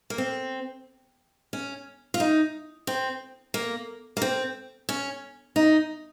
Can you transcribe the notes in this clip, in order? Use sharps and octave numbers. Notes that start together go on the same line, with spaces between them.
A#3
C4
C#4
F4
D#4
C4
A#3
A#3
C4
C#4
D#4